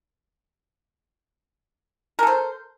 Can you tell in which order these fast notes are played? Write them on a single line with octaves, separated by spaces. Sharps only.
A#4 A4 C5